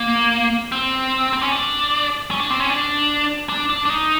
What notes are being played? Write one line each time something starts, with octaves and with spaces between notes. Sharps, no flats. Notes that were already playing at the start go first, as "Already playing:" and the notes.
Already playing: A#3
C4
C4
C#4
D4
C#4
D4
C4
C#4
D4
D4
D4
D4
D#4